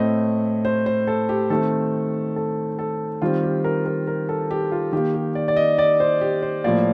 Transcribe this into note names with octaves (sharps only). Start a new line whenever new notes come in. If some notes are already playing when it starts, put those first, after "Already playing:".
Already playing: A2 A3 C4 D#5
C5
C5
A4
G4
D#3 A3 C4 A4
A4
A4
D#3 G3 C4 F4
G4
A#4
A#4
A#4
A4
G4
F4
D#3 A#3 G4
G4
D5
D5
D#5
D5
C5
G4
C5
A2 F3 A#3 D5